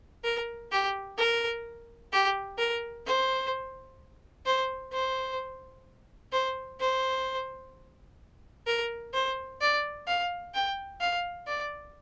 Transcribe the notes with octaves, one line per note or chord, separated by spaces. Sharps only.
A#4
G4
A#4
G4
A#4
C5
C5
C5
C5
C5
A#4
C5
D5
F5
G5
F5
D5